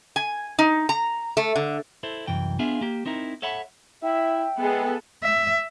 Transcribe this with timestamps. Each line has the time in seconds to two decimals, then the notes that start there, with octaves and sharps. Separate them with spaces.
0.16 G#5
0.59 D#4
0.89 A#5
1.37 A3
1.56 D3
2.03 E4 A4 C5
2.27 C2 F#2 E3 G5
2.59 B3 D4 F4 G#4 E5 F5
2.81 A#3 G4
3.06 C4 D#4 E4 A#4
3.42 A4 C#5 E5 F#5 A5 B5
4.03 E4 E5 G5
4.60 G#3 B3 G#4 A4
5.23 E5